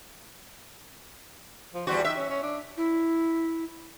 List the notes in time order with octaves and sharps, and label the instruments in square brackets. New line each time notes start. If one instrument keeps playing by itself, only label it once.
[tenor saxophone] F3
[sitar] E2 G3 F#4 [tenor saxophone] C5
[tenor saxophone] D#4 [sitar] E5
[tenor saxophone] C#4
C#4
D4
[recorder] E4